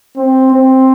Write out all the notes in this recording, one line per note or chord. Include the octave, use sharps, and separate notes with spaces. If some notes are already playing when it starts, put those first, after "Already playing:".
C4
C4